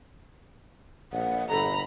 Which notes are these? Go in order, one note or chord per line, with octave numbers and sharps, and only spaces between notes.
A#1 F#5
G1 A4 A#5 B5